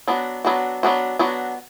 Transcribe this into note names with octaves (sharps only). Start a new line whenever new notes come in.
F#3 B3 D4 F#4
F#3 B3 D4 F#4
F#3 B3 D4 F#4
F#3 B3 D4 F#4